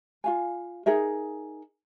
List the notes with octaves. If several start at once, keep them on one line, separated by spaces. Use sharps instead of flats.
F4 F5 G#5
D#4 G#4 A#4 E5